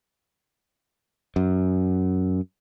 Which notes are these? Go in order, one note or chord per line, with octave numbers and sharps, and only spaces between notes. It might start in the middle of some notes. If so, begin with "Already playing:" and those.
F#2